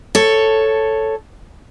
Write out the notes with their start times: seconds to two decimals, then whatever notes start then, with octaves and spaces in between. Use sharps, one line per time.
0.15 A4 C#5